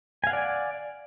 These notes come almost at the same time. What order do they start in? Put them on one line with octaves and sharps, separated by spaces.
G#5 F5 F#5 D5